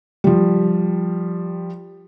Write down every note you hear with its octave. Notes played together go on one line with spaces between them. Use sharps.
F3 G3